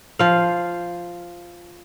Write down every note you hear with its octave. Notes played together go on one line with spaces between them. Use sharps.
F3 F5